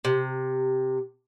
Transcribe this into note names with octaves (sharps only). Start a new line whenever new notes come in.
C3